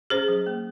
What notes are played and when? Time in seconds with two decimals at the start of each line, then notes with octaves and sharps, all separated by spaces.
0.10 C#4 G#4 C5
0.28 F#3
0.46 A#3